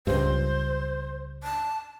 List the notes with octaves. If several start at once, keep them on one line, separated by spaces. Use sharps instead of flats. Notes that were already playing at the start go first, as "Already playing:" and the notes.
C#2 G2 C5
A5